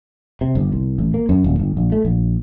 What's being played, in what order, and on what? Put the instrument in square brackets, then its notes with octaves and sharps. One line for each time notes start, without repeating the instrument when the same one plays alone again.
[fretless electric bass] C3
G1
C2
A1
A#3
F#2
D#1
G1
A#1
A3
A#1